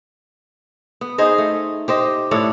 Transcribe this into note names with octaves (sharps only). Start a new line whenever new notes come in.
B3
D#4 G#4 C5 D#5
A3
G4 C5 D#5
A2 D4 E4 C#5